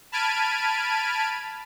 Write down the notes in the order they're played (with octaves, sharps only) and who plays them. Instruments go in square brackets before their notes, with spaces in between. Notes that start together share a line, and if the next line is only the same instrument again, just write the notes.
[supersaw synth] A5 B5 F6 G#6 D7 D#7